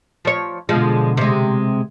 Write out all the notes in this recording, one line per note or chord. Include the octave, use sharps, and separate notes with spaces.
F3 C#5
B2 D3 F3 G#3
C3 G#3